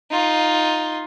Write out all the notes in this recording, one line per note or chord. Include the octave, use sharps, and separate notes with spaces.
D#4 F4